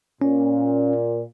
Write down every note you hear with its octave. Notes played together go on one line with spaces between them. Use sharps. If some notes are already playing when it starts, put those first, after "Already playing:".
A#2 C#4